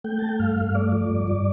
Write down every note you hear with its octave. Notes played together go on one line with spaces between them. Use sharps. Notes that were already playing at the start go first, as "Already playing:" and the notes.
A3 G5
A3 A5
G5
G2 F5
G2
A3 D5
F3
G2
G2